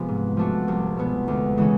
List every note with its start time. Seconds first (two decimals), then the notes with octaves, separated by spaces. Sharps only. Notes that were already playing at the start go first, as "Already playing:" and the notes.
Already playing: C3 F3 G#3 B3
0.09 G#2
0.37 F3 A3 D4 F#4
0.68 C2
0.97 B2 G#3 B3
1.28 D2
1.58 C#3 E3 G#3 C#4